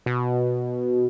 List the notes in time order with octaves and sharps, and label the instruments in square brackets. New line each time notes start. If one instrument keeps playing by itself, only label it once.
[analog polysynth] B2